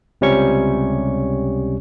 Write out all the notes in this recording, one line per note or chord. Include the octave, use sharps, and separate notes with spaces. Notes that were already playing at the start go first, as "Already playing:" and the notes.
C#2 C3 G3 C#4 C#5 C#6